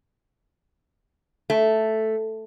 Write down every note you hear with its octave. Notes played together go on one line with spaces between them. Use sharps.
A3